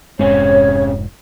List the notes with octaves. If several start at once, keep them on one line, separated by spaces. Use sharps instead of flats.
F1 G#2 C3 G#3 C#4 C#5